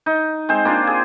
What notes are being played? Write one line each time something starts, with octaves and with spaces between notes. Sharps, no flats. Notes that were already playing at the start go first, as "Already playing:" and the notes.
D#4
G#3 C4 C5
A#3 D4 F4
G#4